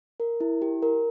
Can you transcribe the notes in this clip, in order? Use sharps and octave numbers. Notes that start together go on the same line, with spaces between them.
A#4
E4
G4
A#4